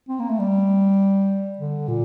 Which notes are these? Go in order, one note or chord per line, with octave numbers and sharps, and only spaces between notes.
C4
A#3
A3
G3
D3
A#2